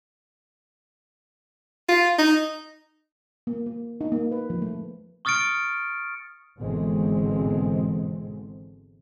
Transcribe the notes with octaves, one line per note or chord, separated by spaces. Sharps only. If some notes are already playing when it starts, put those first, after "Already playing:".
F4
D#4
A#3
A#3
D#4
A#3
B4
F3
A3
C#6 D#6 F6 A6 C#7 D7
G#1 B2 D3 E3 G#3 C4